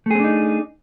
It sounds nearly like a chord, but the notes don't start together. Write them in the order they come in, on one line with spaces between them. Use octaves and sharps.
A3 G#4 C4 D4 D#4